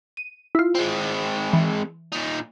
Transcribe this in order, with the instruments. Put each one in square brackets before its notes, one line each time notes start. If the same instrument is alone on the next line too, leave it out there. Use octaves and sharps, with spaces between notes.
[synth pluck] D#7
E4 F4
[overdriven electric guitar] G#3 C4
[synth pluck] E3
[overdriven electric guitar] A#2 D#4